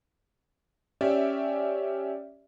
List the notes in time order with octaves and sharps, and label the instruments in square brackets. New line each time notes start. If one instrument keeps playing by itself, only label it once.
[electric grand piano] C#4 G4 D5 E5